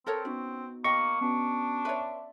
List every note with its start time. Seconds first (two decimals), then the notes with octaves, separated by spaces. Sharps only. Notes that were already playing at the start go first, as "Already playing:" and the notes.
0.07 C4 A4 A#4 C#5
0.25 B3 C#4 D#4 F#4
0.84 A#3 D#5 G5 C#6
1.21 B3 C#4 D4 F#4
1.85 B4 C#5 D5 E5 C6